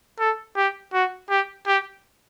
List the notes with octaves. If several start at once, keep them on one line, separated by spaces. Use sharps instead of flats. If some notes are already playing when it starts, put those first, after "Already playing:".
A4
G4
F#4
G4
G4